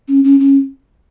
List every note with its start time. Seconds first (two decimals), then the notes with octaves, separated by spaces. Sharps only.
0.08 C#4
0.24 C#4
0.40 C#4